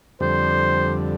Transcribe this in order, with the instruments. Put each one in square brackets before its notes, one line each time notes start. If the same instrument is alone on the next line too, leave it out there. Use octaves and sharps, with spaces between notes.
[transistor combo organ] F2 D3 G3 [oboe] C5